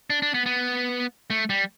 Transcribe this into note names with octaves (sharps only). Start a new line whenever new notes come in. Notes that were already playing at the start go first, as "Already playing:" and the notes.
D4
D4
B3
B3
A3
G3